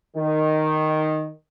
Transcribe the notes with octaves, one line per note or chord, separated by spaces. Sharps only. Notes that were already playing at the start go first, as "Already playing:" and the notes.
D#3